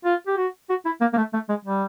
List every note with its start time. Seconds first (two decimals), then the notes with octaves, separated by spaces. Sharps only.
0.05 F4
0.27 G4
0.37 F#4
0.70 F#4
0.85 E4
1.01 A#3
1.13 A#3
1.18 A3
1.34 A3
1.49 G#3
1.65 G3